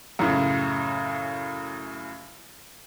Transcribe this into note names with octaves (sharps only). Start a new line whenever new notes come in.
F#2 A2 C#3